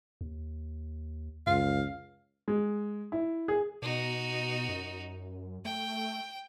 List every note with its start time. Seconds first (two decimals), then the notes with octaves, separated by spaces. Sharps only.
0.21 D#2
1.47 C#2 F#2 F5
2.48 G#3
3.12 E4
3.48 G#4
3.82 B2 D#4 F#4
4.69 F#2
5.65 A3 G5